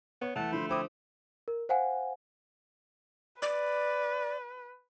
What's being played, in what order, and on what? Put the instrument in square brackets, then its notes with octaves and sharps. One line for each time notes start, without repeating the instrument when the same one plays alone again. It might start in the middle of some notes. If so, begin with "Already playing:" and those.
[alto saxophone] B3 [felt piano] C#5
[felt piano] E2 [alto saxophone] A3 [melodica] F#5 A5
[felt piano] D3 F3 [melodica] C5 B5 C6
[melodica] C4 E4 [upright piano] C5 D6 D#6
[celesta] A#4
C5 F5 F#5 G#5
[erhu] B4 [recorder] D5